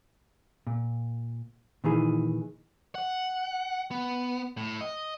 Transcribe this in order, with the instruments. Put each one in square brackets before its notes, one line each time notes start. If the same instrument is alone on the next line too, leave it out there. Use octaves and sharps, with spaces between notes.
[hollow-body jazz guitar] A#2
A#2 D#3 E3 G#4
[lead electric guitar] F#5
B3
A2
D#5